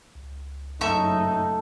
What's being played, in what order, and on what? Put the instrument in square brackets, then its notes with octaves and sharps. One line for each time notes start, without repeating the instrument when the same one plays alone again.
[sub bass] C#2
[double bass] F#1 D#4 [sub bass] G2 [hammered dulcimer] A3 [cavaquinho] E5 C#6